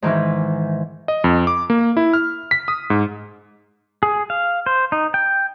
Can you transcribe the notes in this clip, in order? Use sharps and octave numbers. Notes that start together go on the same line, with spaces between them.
G#2 D#3 E3
D#5
F2
D6
A#3
E4
F6
B6
D#6
G#2
G#4
F5
C5
D#4
G5